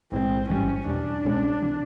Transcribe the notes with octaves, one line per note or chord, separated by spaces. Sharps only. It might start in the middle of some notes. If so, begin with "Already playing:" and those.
B1 A2 E3 G#3 C4
A1 G#2 E3 G3 C#4
E2 B2 G3 D4
C2 B2 G#3 C#4
C3 E3